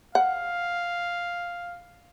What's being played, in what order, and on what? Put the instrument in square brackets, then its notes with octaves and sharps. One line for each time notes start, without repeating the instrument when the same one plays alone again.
[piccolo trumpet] F5 [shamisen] F#5